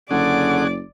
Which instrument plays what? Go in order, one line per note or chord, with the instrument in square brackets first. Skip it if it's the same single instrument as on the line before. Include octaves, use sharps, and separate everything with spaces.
[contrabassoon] F#1 [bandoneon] D3 [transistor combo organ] C#4 G#4 F#5 [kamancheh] D5 D6